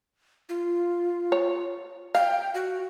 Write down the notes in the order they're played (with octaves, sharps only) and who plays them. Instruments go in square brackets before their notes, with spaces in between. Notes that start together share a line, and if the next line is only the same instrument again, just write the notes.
[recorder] F4
[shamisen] C#5
[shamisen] F5 [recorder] G5
[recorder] F#4